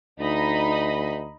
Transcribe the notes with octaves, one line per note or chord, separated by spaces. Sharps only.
D2 D#4 D#5 B5